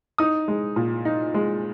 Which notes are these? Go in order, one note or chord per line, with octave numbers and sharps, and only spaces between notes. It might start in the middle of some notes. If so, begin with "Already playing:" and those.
D#4 D#6
G#3
A#2
D#4
G#3